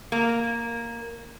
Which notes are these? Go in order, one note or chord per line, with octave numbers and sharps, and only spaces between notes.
A#3